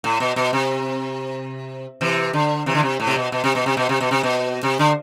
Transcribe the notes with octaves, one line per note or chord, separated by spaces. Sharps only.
A2
B2
B2
C3
C3 E3
D3
C3 E3
D3
C3
A2
C3
B2
B2
C3
B2
C3
B2
C3
B2
C3
B2
C3
D3